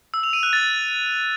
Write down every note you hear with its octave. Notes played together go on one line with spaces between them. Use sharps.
E6
F7
D#7
F#6
A6